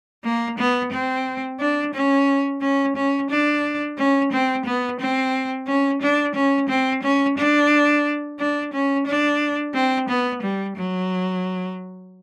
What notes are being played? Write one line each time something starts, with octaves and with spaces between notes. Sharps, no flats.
A#3
B3
C4
D4
C#4
C#4
C#4
D4
C#4
C4
B3
C4
C#4
D4
C#4
C4
C#4
D4
D4
C#4
D4
C4
B3
G3
F#3